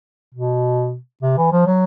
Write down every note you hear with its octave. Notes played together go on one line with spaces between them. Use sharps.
B2
C3
E3
F3
F#3